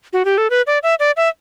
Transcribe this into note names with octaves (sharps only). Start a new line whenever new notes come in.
F#4
G4
A4
B4
D5
E5
D5
E5